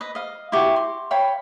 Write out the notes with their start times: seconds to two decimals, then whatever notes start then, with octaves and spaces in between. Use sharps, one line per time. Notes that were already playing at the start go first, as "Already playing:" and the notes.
0.01 B4 D#5
0.15 D#5 F5
0.52 E4 F#4 G4
0.76 C6
1.11 C#5 F5 G5 B5